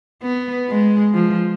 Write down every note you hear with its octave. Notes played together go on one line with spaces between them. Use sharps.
B3
G#3
F3